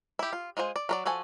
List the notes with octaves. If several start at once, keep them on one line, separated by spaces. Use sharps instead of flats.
E4 G4
F4
G#3 F4 C5 G#5
D5
F#3 A#4 D5
F3 F#4 A4 G#5